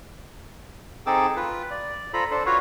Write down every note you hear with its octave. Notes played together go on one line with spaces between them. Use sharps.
C4 D#4 G#4 A4 D6 E6
F4 B4
D5
F4 A4 C5 A#5 B5
D4 A4 C5
F4 F#4 B4 C#5 F5